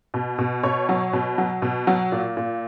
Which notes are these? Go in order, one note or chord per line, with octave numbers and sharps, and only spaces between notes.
B2
B2
B2 C#5
F#3
B2
F#3
B2
F#3
A#2
A#2